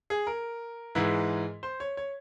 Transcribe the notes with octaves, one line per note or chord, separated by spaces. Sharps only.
G#4
A#4
G#2 E3 G#3 E4
C5
C#5
C#5